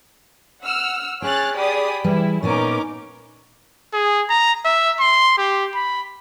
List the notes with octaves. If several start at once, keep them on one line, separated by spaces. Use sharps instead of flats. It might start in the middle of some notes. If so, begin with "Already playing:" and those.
F#5 E6 F6
C#4 G#4 G5 F6 F#6 A6
G4 G#4 D5 B5 D#6
E3 G3 E4 G#4
A#2 B3 C#4 D#4 A#4 G#5 D6
G#4
A#5
E5
C6
G4
B5